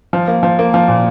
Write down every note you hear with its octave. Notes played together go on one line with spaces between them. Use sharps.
F3
A#3
F3
A#3
F3
A#2